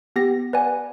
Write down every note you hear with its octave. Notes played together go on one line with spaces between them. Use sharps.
B3 G4 A#6
B4 D5 F#5 G#5